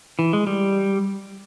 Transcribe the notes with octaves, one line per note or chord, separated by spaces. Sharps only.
E3
G#3
G3